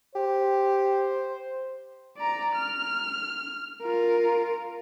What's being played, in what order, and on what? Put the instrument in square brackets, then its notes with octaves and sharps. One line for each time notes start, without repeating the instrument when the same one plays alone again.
[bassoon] G4 [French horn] C5
[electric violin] D5 A#5
F6
F4 A#4